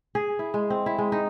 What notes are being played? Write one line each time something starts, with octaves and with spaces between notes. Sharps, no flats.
G#4
E4
G#3
C4
E4
G#3
D#4